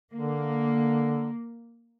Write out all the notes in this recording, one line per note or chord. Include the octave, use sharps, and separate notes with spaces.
D3 A#3